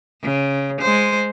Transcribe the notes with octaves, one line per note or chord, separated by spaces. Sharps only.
C#3
G#3 C5